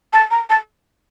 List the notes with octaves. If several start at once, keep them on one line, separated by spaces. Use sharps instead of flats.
A5
A#5
A5